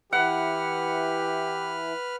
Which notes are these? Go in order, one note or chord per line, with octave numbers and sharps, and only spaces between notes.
E3 E4 G4 B4 F#5 F6